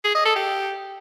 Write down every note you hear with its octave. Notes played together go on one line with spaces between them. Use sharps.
G#4
D#5
A4
G4